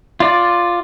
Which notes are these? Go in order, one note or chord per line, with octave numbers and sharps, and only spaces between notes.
F4 D5